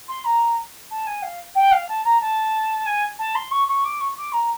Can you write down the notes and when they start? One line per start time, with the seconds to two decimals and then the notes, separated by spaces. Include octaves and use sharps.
0.08 C6
0.25 A#5
0.90 A5
1.06 G#5
1.22 F5
1.55 G5
1.71 F5
1.88 A5
2.04 A#5
2.20 A5
2.86 G#5
3.18 A5
3.35 C6
3.51 C#6
3.67 C#6
3.84 D6
4.00 C#6
4.17 D6
4.32 A#5